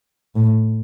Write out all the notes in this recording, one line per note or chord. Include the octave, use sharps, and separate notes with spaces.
A2